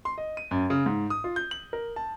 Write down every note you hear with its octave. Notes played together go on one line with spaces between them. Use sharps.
C6
D#5
D#7
F#2
C#3
G#2
D#6
F4
G6
F#7
A#4
A5